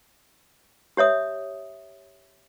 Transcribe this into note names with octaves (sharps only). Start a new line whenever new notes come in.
G4 C#5 E5 D#6